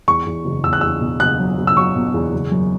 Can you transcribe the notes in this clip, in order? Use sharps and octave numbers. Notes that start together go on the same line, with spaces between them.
E2 C#6
E2
F#1
E2 E6
F#6
E2 E6
B2
F#1 F#6
F#3
F#1
E6
F#3 C#6
B2
E2
F#1
F#2